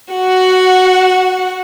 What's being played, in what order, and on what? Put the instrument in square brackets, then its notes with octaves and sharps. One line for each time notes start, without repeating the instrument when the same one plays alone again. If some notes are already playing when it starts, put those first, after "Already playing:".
[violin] F#4 F#5